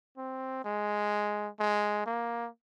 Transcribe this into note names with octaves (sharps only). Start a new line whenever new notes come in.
C4
G#3
G#3
A#3